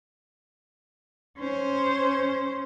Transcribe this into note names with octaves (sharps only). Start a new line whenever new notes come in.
C#4 C5